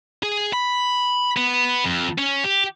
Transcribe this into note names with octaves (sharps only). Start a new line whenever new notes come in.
G#4
B5
B3
F2
C#4
G4